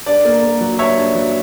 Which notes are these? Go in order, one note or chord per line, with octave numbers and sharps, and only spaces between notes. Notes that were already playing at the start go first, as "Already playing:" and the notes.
G2 D5
A#3
A#3
F#3
G2 C#5 E5
G2
F#3